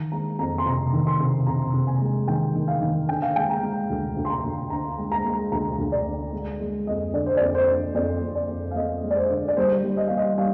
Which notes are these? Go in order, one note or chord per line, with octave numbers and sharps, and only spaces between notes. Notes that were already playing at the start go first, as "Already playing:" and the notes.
Already playing: D#3 A#5
G#3 A#5
F2 A#5
C6
C3 A#5
D#3
C6
C3
C3 A#5
C3
G#5
G#3
D#3 G5
D#3
F5
D#3
D3 G5
F5
G#3 G5
A#5
G#3
D2
D2
C6
A#5
D2
D3 A#5
G#3
A#5
G#3
D2 A#5
D2
D5
D3
G#3
G#3
F2 D#5
D3 D5
C5
F2 D5
C5
D3
F2 D5
F2
D5
F2
F5
F2 D#5
G#3
D5
C5
D3
D5
G3 C5
G3
D#5
G3 F5
D#5
G3 F5